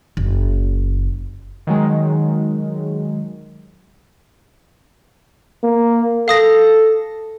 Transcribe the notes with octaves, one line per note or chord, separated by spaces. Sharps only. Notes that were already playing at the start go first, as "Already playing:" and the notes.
F#1
D#3 F#3 G#3
A#3
A4 F5 D#6 A#6